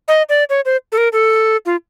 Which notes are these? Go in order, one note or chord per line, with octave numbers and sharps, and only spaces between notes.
D#5
D5
C#5
C5
A4
A#4
A4
F4